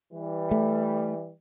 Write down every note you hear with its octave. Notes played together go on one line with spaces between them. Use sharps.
E3 G3
A3